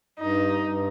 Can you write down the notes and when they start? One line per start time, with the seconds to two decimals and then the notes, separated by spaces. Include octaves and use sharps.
0.20 G2 D#4
0.61 G2